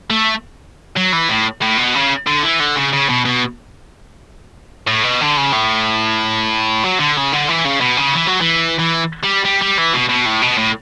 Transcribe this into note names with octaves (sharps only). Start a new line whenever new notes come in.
A3
F#3
E3
A2
A2
B2
C#3
D3
E3
D3
C#3
C#3
B2
B2
A2
B2
D3
C#3
A2
F#3
D3
C#3
D3
E3
C#3
B2
C#3
E3
F#3
E3
E3
G3
G3
G3
E3
B2
B2
A2
B2
A2